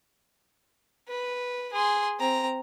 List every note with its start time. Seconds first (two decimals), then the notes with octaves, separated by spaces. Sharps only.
1.09 B4
1.73 G#4 C6
2.19 C4 A#5